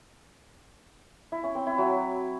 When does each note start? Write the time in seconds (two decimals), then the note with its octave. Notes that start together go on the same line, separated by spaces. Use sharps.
1.32 E4
1.44 C#4
1.55 C4
1.67 E4
1.78 F#3